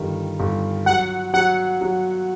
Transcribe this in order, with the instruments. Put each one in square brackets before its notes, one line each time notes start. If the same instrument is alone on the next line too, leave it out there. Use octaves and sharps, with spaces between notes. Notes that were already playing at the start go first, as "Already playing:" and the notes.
Already playing: [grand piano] G1 D#3 G3
G1
[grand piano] F#3 [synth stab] F#5
[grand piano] F#3 [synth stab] F#5
[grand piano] F#3